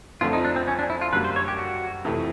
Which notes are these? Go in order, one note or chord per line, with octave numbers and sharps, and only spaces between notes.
F2 D3 F3 A3 F4
D#4
D4
C4
C#4
D4
E4
F4
F#2 D3 G3 A#3 B4
C5
C#5
G4
F#4
F2 C3 E3 A3